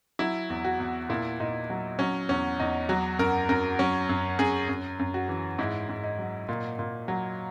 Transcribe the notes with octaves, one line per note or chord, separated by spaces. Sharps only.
F#3 E4
E2
F#4
E2
A#2 E4
A#2 D#4
F#3
F#3 C#4
E2 C#4
E2 D#4
F#3 F#4
F#2 A#4
F#2 A#4
F#3 C#4
F#2
F#2 G#4
F#2
F#2
F#4
E3
G#2 E4
G#2
D#4
F#3
A#2
A#2
F#3